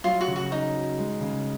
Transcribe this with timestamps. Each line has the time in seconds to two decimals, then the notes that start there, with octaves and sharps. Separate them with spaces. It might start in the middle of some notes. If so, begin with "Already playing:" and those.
0.04 F#3 F4
0.21 F#4
0.28 C#3
0.36 F#4
0.51 C#4 D#4
0.74 F#4
0.98 G#3
1.21 C#3